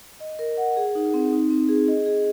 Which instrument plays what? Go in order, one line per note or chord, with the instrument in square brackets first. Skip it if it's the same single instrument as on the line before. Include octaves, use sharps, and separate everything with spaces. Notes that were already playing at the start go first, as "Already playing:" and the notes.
[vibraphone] D#5
A#4
F#5
G#4
D#4
C4
D#4
C4
G#4
D#5
G#4